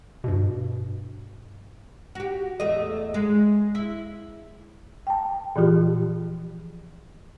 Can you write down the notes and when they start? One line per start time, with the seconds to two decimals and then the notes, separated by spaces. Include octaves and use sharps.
0.24 G2 B2
2.15 F#4 G4
2.60 E2 A3 D#5
3.14 G#3
3.75 E4
5.07 G5 A5
5.56 A#2 E3 F3 F4 G4